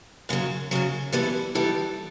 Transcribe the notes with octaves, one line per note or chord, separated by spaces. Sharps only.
F#2 C#3 F#3
F#2 C#3 F#3
E3 G3 B3 E4 A4
E3 G3 B3 E4 A4